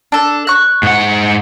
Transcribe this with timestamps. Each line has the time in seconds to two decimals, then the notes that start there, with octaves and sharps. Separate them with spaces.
0.12 D4 A4
0.47 C#6 F#6
0.83 G#2 F#5